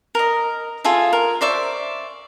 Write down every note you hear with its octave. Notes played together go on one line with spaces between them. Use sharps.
A#4 D#5
F4 G#4 A4 E5
A#4
C5 D5 E5 C#6